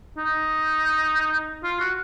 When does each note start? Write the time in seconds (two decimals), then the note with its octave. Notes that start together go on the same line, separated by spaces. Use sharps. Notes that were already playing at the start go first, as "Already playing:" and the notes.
0.17 D#4
1.63 F4
1.80 F#4